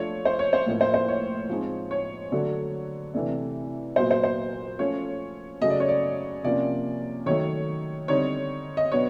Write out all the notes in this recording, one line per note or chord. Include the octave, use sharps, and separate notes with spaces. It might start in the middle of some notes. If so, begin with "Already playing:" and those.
Already playing: F3 A3 D4 C#5
C5
C#5
C5
A2 F3 A#3
C5
C5
C#5
F3 G#3 C4 D#4
C#5
D3 F#3 A3 D4
C3 E3 A3 D4
A#2 F#3 B3 C5
C5
C5
F3 A3 C#4 C#5
C#3 F#3 A3 D#5
D5
C#5
D5
C3 F3 A#3 C#4 D5
D#3 F#3 A3 C#5
D3 G3 C4 D#4 C#5
D#5
B2 F#3 B3 D4 C#5